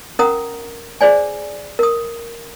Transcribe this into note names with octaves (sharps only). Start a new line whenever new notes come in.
C#4 A#4 F#5 A#5 D#6
G#4 C5 D5 G#5
A#4 D#6